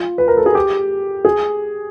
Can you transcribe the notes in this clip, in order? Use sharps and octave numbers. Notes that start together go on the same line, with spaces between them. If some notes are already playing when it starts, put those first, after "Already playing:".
Already playing: F4
B4
A#4
A4
G#4
G4
G#4